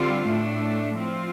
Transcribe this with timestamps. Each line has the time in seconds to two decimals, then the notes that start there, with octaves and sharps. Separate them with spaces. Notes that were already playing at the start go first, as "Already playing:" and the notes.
Already playing: D3 G3 C4 F4
0.26 A2 A3 D4
0.97 F3 C4 F4